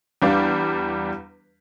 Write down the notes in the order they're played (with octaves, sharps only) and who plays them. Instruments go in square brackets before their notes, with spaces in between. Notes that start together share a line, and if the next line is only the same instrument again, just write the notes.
[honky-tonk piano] E2 G3 D4 F5 D6